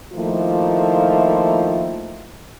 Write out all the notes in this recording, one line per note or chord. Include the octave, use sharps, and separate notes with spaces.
D#3 F3 A3 A#3 E4 F4